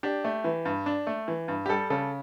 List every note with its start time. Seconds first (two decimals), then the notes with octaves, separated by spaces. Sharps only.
0.03 D4 G4
0.24 A3
0.44 E3
0.65 G2
0.86 D4
1.07 A3
1.28 E3
1.48 G2
1.66 G4
1.69 G3 A4
1.90 C#3 A4